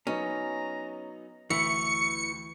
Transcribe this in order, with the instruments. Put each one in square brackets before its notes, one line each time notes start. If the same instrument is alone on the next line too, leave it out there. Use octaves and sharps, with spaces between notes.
[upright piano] F#3 B3 D#4 [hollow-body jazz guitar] C#4 [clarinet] A#5
[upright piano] D2 [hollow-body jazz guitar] E3 [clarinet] C#6 [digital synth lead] C#7